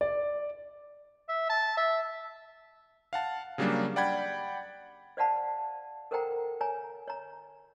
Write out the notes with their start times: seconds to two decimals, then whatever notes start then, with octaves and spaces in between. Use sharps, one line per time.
0.01 D5
1.29 E5
1.50 A5
1.77 E5
3.13 F5 F#5 A5
3.58 C#3 F#3 G3 A#3 D4
3.96 D5 F#5 G5 B5 G#6
5.17 C5 D5 F5 F#5 A5 B5
6.11 A4 A#4 C5 F#5 G5 A#5
6.61 C#5 G#5 A#5
7.08 C#5 A#5